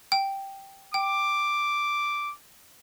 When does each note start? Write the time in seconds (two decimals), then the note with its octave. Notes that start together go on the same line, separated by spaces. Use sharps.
0.12 G5
0.94 G5 D6